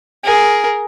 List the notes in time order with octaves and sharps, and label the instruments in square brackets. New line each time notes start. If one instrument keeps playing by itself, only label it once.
[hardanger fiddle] G#4 A#4